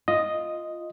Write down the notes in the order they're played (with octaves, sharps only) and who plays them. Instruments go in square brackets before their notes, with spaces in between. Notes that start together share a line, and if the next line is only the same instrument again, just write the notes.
[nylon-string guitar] F4 [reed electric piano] D#5